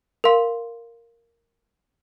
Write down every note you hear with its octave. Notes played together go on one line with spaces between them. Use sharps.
A#4 F5 C6